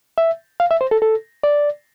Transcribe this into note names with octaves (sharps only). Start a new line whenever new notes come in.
E5
F5
E5
C5
A4
A4
D5